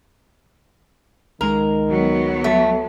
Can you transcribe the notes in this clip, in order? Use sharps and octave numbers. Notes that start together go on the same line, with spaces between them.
C#2 D#3 G#3 A#4
F#3 B3
A3